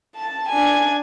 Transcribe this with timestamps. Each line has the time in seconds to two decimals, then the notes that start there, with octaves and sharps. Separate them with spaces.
0.15 A5
0.49 D4 G#5